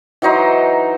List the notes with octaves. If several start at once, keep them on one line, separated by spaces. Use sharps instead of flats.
E3 F#3 D#4 C5